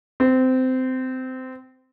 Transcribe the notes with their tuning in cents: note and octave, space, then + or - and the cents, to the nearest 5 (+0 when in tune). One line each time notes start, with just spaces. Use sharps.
C4 -20